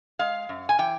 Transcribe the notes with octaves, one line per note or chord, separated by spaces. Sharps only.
G#3 F5
F#2
G#5
E3 G5